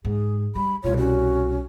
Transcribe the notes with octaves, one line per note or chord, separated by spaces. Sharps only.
G#2 G#4
G3 B5
C2 B2 F4 C#5
C#4 F#4